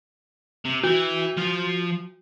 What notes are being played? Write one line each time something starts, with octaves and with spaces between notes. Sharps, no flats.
C3
E3 E4 F#4
F3 F5